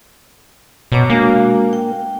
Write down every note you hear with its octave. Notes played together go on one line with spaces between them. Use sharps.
B2 C#5 A#5 D6
G#3 A#3 D4 F#4
G5